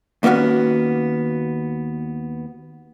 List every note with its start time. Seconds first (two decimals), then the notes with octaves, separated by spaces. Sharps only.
0.23 D#2 A#3 B3 C#4 F#4